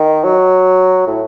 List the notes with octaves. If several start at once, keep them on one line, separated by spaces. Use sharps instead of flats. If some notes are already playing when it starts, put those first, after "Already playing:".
Already playing: D#3
F#3
A2